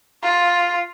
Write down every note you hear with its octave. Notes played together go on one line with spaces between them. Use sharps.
F4